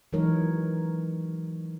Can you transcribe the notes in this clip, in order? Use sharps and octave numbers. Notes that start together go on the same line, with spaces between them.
E3 F#3 G#3 D#4 A#4 C#5